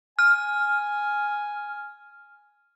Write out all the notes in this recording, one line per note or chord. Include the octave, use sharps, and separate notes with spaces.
G#5 F6